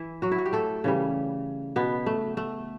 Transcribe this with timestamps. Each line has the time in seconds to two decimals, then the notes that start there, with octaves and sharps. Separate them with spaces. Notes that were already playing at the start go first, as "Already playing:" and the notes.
Already playing: E3 E4
0.22 F#3 F#4
0.32 E4
0.38 F#4
0.46 G4
0.53 A3 A4
0.84 C#3 E3 G3
1.76 B2 B3
2.06 A3
2.37 A3